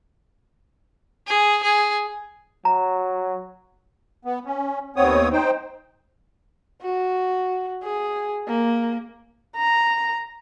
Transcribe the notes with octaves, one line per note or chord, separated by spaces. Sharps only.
G#4
G#4
F#3 A#5
B3
C#4
D#2 B3 C4 C#5 D#6
D#4 C5 G5
F#4
G#4
A#3
A#5